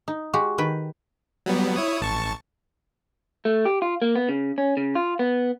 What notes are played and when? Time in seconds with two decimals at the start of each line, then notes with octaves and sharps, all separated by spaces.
0.08 D#4
0.33 G#3 F#4 G4
0.58 D#3 B4 G5
1.46 F#3 G3 B3
1.76 E4 C#5 D#6
2.01 A1 A5 C#6
3.45 A3
3.65 G4
3.82 F4
4.02 A#3
4.16 B3
4.29 C#3
4.58 C#4
4.77 C#3
4.95 F4
5.19 B3